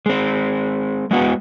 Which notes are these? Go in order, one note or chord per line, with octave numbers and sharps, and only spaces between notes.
G#3 C4
G#3 B3 F#4